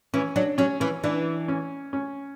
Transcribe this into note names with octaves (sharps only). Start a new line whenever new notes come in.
E3 C#4
F#3 D4
F#3 C#4
E3 C#4
E3 D4
C#4
C#4